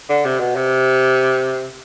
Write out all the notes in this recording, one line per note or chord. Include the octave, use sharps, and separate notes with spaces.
D3
C3
B2
C3